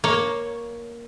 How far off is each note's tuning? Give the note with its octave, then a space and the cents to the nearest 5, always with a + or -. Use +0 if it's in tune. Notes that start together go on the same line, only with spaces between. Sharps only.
A#3 +10 C#5 +0